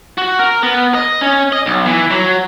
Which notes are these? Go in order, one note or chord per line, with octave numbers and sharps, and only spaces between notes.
F#4
A#4
B3
D#5
C#4
D#5
B1
E3
F#3